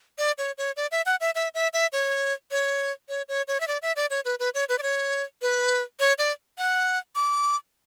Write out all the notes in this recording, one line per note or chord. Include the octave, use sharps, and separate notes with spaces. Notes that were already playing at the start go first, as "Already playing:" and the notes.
D5
C#5
C#5
D5
E5
F#5
E5
E5
E5
E5
C#5
C#5
C#5
C#5
C#5
E5
D5
E5
D5
C#5
B4
B4
C#5
B4
D5
C#5
B4
C#5
D5
F#5
D6